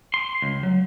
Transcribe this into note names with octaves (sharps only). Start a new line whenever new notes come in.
C6
C#2
F#3